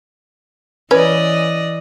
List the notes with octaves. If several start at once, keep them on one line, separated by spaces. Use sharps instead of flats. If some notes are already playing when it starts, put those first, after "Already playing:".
E3 C#4 B4 D5 D#5